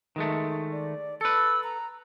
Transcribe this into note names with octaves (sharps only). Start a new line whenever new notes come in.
D#3 G#3 A3
D5
A4 B4 E6
A#5